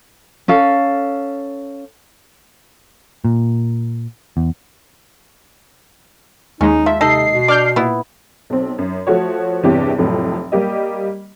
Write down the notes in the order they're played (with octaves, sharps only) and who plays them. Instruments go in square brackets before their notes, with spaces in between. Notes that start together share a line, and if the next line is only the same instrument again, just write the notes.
[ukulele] C#4 A4 F5
[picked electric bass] A#2
E2
[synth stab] D#2 G#3 [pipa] C#4 [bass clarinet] D#4
[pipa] F3 [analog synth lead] E5
[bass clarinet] C3 [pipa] D#4 A4 D#5 [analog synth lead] C7
[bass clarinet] B2
[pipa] D4 [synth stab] D6 F6 G6
[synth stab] A#2 [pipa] B3 E4
[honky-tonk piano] B1 C4
F#2
F3 A3 F#4 C#5
E2 G2 C3 E4 G4 C#5
F1 F2 A2 F#3
G3 A#3 G4 D#5